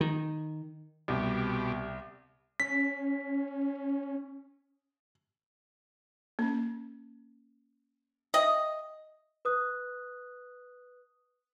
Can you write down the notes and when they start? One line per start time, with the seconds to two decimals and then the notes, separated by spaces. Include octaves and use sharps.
0.01 D#3
1.08 C2 B2 G4
2.60 C#4 B6
6.39 A#3 C#4
8.34 D#5 E5 G5
9.45 B4 D#6 F#6